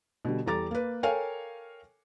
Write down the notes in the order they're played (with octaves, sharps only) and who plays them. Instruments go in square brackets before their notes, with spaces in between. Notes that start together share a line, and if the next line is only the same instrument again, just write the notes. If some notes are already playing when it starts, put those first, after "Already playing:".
[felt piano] B2 D3 G3
E2 G3 A4 A#5 D6 A6
A#3 B4
A4 A#4 C#5 F5 G5 G#5